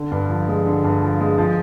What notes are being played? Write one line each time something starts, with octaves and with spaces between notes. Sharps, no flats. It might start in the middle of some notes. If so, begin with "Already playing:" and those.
Already playing: D3
G2
F3
G#3
D3
G2
F3
G#3
F3